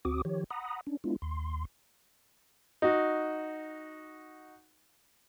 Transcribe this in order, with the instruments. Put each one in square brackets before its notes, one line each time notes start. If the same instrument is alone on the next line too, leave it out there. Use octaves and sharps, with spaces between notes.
[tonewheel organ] D2 C4 F#4 D6 D#6
D#3 F3 G4 C#5
F#5 A#5 B5 D#6
C#4 D4
G#3 B3 D4 E4 F4
D#2 C6
[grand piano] D#4 F#4